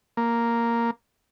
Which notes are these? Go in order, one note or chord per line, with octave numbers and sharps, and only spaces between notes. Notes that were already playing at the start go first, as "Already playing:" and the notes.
A#3